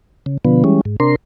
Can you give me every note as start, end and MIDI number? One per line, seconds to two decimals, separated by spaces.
0.26 0.38 49
0.45 0.64 47
0.45 0.64 50
0.45 0.64 53
0.45 0.64 59
0.64 0.81 52
0.64 0.81 55
0.64 0.81 56
0.64 0.81 61
0.85 0.96 44
1.00 1.16 48
1.00 1.16 62
1.00 1.16 70
1.00 1.16 84